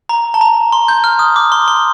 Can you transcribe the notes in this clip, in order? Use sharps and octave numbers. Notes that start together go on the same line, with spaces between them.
A#5
A5
A#5
C6
G6
F6
D#6
D6
C6
C6